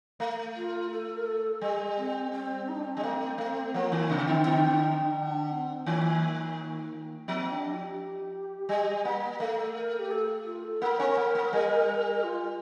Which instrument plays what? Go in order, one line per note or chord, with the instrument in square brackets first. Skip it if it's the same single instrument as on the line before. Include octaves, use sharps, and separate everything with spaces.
[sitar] A3
[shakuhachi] F4
A4
A#4
A4
[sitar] G3
[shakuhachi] C4
C4
D#4
D4
C4
[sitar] G3 [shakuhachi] D4
[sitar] A3 [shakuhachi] C4
[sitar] A3
[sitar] F3 [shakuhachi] A#3
[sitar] D#3
[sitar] C3 [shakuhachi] C4
[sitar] D3
[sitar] D3 [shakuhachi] C4
[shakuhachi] D#4
D4
C4
[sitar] D#3 [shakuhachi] A#3
[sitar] F3 [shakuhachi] C4
[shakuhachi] D4
G4
[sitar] G3
A#3
[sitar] A3 [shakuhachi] A4
[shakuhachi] A#4
G4
A4
F4
A4
[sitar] A#3 [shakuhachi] A#4
[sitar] C4
A#3
A#3
G3
[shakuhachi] F4